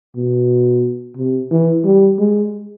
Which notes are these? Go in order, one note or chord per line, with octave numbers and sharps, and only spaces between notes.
B2
C3
E3
G3
G#3